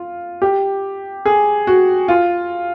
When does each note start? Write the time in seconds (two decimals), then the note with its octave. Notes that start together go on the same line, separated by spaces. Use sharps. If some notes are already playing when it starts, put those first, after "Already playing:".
Already playing: F4
0.42 G4
1.25 G#4
1.67 F#4
2.08 F4